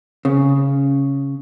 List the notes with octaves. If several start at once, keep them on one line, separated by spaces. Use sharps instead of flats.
C#3